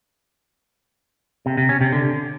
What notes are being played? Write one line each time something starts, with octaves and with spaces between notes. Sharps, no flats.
C3
C3
C#4
C3
D3